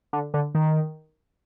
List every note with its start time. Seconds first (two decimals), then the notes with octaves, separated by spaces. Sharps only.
0.13 D3
0.34 D3
0.55 D#3